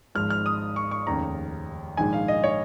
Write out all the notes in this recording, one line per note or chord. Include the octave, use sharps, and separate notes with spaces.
G#1 G#2 F3 G#3 F6
F6
D#6
C#6
C#6
F1 D#2 C#3 A#5
A#1 G#2 D#3 G#3 G#5
F5
D#5
C#5